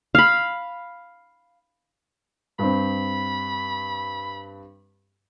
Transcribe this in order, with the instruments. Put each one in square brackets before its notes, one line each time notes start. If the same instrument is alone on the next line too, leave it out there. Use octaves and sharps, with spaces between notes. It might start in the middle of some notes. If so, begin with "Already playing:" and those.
[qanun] F5 B5
[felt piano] G2 C4 [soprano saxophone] B5